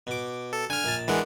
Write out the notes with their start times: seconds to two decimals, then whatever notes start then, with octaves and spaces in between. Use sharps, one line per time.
0.07 B2 D6
0.53 A4
0.70 D3 G#5 F6
0.84 A#1 A5
1.08 E3 G#3 D4 A#4 F#5